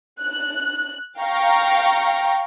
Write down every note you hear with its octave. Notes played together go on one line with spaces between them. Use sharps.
F#6
F5 G5 A#5 C#6